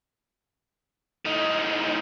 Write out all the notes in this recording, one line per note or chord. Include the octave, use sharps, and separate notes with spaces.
A2 D#4